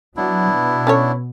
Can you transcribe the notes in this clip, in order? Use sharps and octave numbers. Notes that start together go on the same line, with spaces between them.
F#3 B3 D4 E4
B2
C#4 A4 C#5